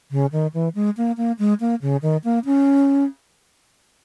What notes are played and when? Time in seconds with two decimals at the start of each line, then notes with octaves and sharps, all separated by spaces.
0.11 C#3
0.32 D#3
0.54 E3
0.75 G#3
0.97 A#3
1.17 A#3
1.39 G#3
1.60 A#3
1.82 C#3
2.02 D#3
2.24 A#3
2.45 C#4